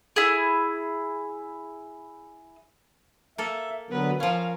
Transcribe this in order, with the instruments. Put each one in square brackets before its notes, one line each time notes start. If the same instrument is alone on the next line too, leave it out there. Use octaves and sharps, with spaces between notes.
[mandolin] E4 G#4
[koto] A#3 A4 [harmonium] E5
[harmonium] D3 F#3 B3 [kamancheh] A#4 B4
[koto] F3 C#4 [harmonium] A#4 [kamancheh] F5